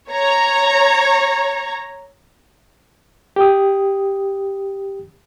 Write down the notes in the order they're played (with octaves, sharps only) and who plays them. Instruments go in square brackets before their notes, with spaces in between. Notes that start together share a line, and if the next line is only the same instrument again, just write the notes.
[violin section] C#5 A#5
[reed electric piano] G4 D#6